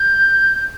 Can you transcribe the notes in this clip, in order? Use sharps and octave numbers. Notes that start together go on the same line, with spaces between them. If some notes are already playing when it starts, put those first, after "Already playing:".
Already playing: G6